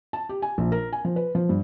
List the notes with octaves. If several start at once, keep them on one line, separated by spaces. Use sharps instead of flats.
A5
G4
G#5
A#1
A#4
G#5
F3
B4
F3
G2